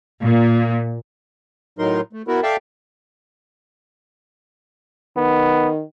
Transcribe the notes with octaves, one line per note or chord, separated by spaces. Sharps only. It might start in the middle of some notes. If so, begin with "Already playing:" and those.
A#2
A2 F#3 D#4 A#4 C6
A3
B3 E4 F#4 A#4
A4 D5 E5 F5 G5 A5
D#3 B3